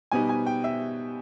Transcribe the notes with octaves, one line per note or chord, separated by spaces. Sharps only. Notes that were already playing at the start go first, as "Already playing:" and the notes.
B2 G3 B3 D#4 G#5
G#5
G5
E5